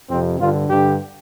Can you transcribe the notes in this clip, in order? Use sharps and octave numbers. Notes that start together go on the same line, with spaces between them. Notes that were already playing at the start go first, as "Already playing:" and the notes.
F2 C3 C4
G2 D3 F4
G2 D3 G4